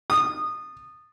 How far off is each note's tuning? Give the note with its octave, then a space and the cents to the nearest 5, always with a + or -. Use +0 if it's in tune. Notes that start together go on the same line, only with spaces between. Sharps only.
D#6 -20